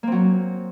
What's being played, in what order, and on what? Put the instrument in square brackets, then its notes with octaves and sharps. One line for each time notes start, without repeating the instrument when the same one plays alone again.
[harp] A#3
C4
F#3